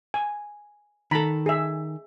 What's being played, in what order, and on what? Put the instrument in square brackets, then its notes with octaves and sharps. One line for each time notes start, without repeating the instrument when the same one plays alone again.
[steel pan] G#5
[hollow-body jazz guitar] D#3 A4 [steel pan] A#5 B5
[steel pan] G#4 E5